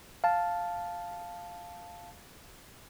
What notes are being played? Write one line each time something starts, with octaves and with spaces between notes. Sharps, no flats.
F5 A5